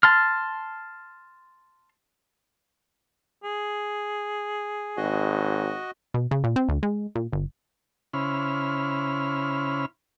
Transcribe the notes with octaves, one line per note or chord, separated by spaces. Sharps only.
A5 C6 F6
G#4
G#1 F#4 D#5
B2
C#3
A#2
C4
D2
G#3
A#2
G1
C#3 C#4 E4 C5 B5 F6